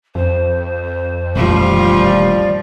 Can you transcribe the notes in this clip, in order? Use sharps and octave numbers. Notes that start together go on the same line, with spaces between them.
F2 C5
D#1 A1 G2 F3 G3 F4
D5